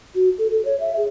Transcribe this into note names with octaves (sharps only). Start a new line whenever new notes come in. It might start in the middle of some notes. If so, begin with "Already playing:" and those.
F#4
A4
A4
C#5
E5
G#4